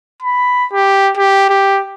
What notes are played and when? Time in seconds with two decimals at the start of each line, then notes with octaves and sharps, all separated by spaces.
0.22 B5
0.73 G4
1.17 G4
1.50 G4